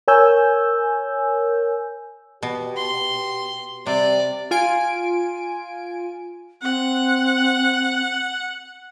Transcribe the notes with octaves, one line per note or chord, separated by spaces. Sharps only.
A#4 C#5 G#5 E6 G6
B2 G4
C6
C3 G3 D5
F4 G#5 D7
C4 F#5